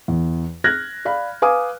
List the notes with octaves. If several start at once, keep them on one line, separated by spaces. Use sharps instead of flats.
E2
F6 F#6 G#6 A#6
D5 F5 B5
B4 F5 G#5 D6 D#6